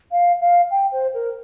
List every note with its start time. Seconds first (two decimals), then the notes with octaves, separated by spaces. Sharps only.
0.12 F5
0.41 F5
0.71 G5
0.92 C5
1.14 A#4